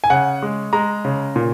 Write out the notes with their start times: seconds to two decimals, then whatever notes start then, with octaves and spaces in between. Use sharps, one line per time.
0.04 G#5
0.10 C#3 F#5
0.42 G#3
0.73 G#3 A#5
1.05 C#3
1.36 A#2